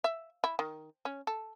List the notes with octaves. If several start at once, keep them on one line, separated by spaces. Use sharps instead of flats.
E5
E4
D#3
C#4
A4